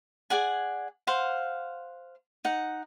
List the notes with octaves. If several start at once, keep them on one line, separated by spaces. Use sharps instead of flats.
G#4 D5 F#5 G#5
C5 F5 F#5
D#4 F#5